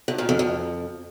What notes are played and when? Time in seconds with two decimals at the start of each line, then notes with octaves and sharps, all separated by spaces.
0.08 G2
0.18 A#2
0.29 F2
0.39 F2